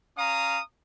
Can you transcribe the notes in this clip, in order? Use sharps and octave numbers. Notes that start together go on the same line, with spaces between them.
C#4 F5 A#5 D#6